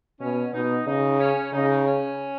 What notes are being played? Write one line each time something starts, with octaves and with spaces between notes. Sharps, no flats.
B2 C#4
B2 D#4
C#3 D#4
C#4
C#3 D#4
C#4